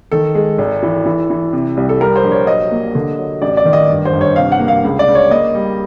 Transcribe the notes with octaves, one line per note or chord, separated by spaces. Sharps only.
D#3 A4
G#3
G#1
E3
E3
E3
C3
C2
A4
G3 A#4
C5
A#1
C#5
F#3 D#5
A#3
D3
F#3
A1 D5
D5
D#3
D#5
G1
C5
G1
C#5
C3 F5
F#5
A#3
F5
C#2
D5
C#2
C#5
A#3 D#5
G3